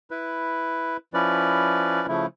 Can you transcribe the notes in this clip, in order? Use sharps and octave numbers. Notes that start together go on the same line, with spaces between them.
E4 B4
F3 C#4 E4 B4 D5
C#3 F3 A3 E4